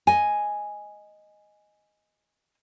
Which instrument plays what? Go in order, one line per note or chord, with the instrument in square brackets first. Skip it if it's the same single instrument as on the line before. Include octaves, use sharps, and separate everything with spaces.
[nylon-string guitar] D#5 G#5